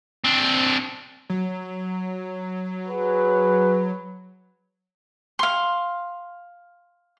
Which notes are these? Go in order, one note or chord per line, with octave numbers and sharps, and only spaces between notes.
C4 D4
F#3
F#4 G#4 B4
F5 C6